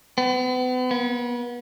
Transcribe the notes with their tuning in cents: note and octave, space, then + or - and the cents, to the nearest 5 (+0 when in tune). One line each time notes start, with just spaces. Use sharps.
B3 +40
B3 -35